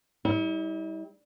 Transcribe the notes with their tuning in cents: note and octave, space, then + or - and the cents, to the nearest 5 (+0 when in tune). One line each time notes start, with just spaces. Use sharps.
G3 +0 E4 -45